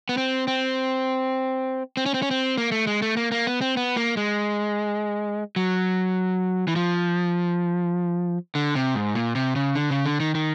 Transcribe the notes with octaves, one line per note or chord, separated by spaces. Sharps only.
B3
C4
C4
C4
C#4
C4
C#4
C4
A#3
A3
G#3
A3
A#3
A#3
B3
C4
B3
A#3
G#3
F#3
E3
F3
D3
C3
G#2
A#2
C3
C#3
D3
C#3
D3
D#3
D#3